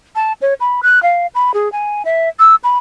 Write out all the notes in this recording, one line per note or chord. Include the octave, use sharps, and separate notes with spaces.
A5
C#5
B5
F#6
F5
B5
G#4
G#5
E5
E6
B5